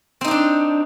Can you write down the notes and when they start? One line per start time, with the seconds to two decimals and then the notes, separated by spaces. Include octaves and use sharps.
0.21 C4
0.24 D#4
0.28 G4
0.31 D4